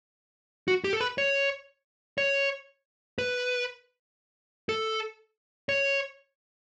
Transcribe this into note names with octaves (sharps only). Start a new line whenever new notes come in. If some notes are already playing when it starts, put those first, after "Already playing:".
F#4
G4
A4
B4
C#5
C#5
B4
A4
C#5